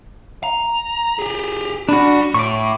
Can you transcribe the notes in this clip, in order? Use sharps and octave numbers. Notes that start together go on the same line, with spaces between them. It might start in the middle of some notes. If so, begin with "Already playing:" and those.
A#5
G4 G#4
D4 F#4 D5 B5
A2 C#6 D6